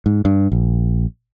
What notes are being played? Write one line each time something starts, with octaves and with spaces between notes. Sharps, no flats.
G#2
G2
A#1